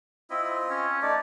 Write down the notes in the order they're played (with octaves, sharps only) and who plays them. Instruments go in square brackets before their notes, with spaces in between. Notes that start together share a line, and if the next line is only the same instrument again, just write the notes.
[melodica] C4 F4 D#5 [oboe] E4
[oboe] C#4
[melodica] A3 D4 D#4 [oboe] D5